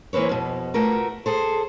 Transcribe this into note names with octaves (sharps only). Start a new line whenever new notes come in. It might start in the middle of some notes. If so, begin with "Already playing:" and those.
E3 A#3 C4 B4 C#5
F2 B2
A3 F4 F#4 A#4 B4
G#4 A4 C5